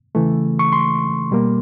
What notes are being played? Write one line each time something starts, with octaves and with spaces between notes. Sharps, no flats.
C#3 E3 A3
C#6
C6
B2 G3 A#3